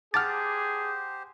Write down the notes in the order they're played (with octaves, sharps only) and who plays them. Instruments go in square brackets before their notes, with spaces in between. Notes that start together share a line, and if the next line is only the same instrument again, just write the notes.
[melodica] G4 C5 [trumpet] G#4 [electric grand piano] F#5 A5 D6 [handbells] F6 A6